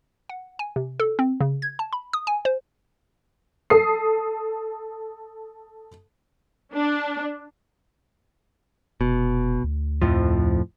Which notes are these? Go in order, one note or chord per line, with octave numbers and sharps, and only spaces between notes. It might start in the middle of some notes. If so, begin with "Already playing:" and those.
F#5
G#5
C3
A4
C4
C#3
G#6
A5
B5
D#6
G#5
C5
A4 D#6 C7
D4
F1 B2
D2
F2 A2 F3